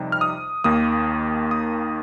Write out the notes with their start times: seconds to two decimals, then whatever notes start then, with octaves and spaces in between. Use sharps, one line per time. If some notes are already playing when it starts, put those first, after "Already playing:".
Already playing: F2 C3 G3 D#4
0.12 F6
0.21 D#6
0.64 D#2 D#3 A#3 D#6
1.51 D#6